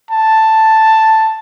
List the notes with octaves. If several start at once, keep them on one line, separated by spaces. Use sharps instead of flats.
A5